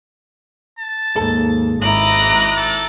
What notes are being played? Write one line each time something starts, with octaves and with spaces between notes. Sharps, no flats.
A5
D#2 G#2 A4
G#1 E4 D#5 A#5 D6 F#6
A4